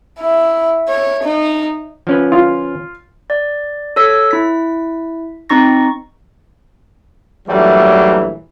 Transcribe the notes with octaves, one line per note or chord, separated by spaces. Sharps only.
E4
C#5
D#4
F3 C#4 B4
F4
D5
A4 C#5 E6 B6
E4 B6
C4 D#4 C#6 A#6
A#1 E3 F#3 G3 A3